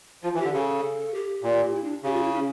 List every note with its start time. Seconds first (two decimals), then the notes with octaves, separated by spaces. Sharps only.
0.23 F3 F4
0.35 E3
0.39 G4
0.45 D3
0.54 C#3 A4
1.14 G4
1.43 A#2
1.74 E4
1.84 D4
2.04 C#3 G4
2.14 F4
2.24 E4
2.34 C#4